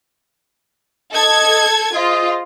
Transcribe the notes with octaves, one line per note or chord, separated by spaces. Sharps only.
A4 D#5 G#6
F4 G#4 C5 D#5